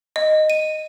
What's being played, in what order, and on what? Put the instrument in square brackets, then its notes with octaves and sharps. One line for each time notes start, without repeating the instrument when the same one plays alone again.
[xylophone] D#5
D#7